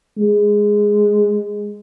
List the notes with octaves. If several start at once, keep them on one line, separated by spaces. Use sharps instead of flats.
G#3